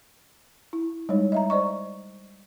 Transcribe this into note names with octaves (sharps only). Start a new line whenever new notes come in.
E4
G3 G#3 D#4 C#5
D#5 E5 A#5
C5 D5 D#5 C#6